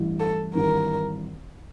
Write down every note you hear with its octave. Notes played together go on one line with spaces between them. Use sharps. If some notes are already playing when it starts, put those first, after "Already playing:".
Already playing: A1 G2 E3
A4
G#1 G2 E3 A#4